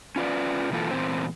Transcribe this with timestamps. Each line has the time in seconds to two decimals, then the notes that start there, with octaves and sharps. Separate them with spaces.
0.16 C#4 F4 B4 D5
0.71 B2 E3 A#3 F4 A4
0.91 E2 A#2 C4 C5